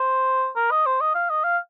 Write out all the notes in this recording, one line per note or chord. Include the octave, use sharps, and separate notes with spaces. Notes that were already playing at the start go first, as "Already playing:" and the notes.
Already playing: C5
A#4
D#5
C5
D#5
F5
D#5
F5